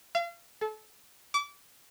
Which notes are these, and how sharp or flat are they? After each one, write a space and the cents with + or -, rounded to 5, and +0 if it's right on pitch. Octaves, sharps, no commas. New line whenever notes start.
F5 -35
A4 -30
D6 -30